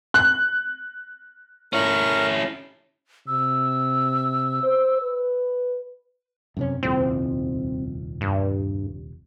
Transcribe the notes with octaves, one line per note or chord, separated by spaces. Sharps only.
F#6
C#4 E4 A#4 C#6
C3 E6
C5
B4
F#2 C3 C#4
D#1 C2 F2 C4
G2